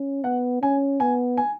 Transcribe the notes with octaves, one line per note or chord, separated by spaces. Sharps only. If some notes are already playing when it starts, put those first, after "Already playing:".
Already playing: C#4
B3 F#5
C#4 G#5
B3 G#5
G#5